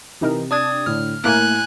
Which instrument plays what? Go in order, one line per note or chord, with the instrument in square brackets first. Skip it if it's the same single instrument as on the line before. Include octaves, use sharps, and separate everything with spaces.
[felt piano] C3 [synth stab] E3 D#4 A#4
[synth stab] D4 [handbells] D5 D#6 G#6
[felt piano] A2 D3 [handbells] F6
[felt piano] A2 E4 [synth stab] A3 A#3 A#4 [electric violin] G#5 F#6